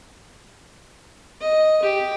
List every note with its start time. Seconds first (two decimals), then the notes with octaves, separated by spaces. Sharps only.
1.40 D#5
1.82 G4